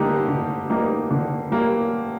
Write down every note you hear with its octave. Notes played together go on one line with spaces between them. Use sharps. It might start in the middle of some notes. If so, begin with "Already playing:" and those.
Already playing: D3 G3 A#3 D#4 G4
D3
G3 A#3 D#4 G4
D3
G3 A#3